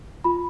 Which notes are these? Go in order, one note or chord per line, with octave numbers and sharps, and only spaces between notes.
F4 B5